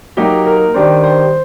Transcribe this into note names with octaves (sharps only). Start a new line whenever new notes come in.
F#3 A#3 D#4 G4
A#4
D#3 G3 D4 C5
C5